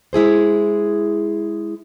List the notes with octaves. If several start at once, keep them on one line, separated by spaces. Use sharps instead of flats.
G#3 E4 G#4 C5